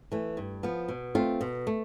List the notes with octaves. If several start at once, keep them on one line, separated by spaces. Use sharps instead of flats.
E3 A3
G2
F3 B3
B2
A3 C4 F4
B2
A3